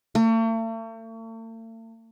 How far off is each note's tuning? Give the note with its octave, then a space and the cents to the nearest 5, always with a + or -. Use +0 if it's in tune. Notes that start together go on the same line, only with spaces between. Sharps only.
A3 +45